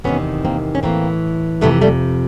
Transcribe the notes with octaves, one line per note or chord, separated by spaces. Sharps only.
E2 C3 D#3 B3 C#4
A#3 C4
C#4
A2 E3 A#3 C4
F2 C3 E3 A3 B3
G3 A3